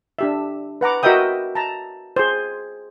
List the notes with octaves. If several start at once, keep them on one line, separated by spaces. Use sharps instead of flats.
D4 G4 E5
B4 F#5 A#5 D6
F#4 A#4 D#5 E5 G5 D#6
A5 A#5
G#4 C5